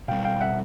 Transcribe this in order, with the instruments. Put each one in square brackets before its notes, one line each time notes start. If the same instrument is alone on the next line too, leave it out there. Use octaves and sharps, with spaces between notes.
[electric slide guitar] B2 G3 C4 [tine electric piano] F5 G5
[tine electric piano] F5 G5
E5 F#5